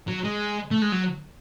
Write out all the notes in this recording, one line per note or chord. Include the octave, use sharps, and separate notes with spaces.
F#3
G#3
A3
G#3
F#3